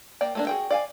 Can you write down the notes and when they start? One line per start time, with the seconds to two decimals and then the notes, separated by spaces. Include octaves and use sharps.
0.21 A#3 D5 G5
0.35 A3 A#3 D4
0.47 F#4 G#4 G5
0.71 D5 F5 G#5